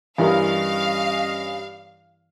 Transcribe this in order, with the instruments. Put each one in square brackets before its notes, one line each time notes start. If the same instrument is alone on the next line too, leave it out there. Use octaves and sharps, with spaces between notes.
[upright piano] G2 [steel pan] E3 E4 A#4 [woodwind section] C#4 D#5 [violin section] F5